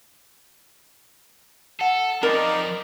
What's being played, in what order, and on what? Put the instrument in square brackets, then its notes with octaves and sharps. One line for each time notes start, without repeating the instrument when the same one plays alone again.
[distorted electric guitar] A4 [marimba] F#5
[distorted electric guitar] F2 F3 [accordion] D#4 D5 [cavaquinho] A#4 [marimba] G5 B5 F6